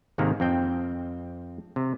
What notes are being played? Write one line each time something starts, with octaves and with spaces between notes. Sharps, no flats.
G#1 G#2 C3 D#3 A#3
F2 C4 G5
C3